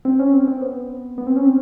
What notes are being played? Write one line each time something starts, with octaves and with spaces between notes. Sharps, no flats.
C4
C#4
C4
C4
B3
B3
C4
C#4
C4